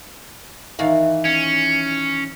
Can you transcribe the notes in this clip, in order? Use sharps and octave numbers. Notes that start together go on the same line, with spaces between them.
D#3 E3 F5
C#4